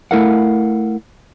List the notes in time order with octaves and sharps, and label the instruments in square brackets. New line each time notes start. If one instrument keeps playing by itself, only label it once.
[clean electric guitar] A3 E4 A4 A#4 F5 F#5